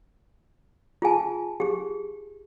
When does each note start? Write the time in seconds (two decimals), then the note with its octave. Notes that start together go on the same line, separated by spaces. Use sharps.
1.02 F4 G#4 G#5 A5
1.60 G4 G#4